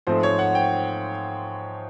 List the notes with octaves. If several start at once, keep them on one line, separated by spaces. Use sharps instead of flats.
G#2 F3 A3 C4 C5
C#5
F#5
G5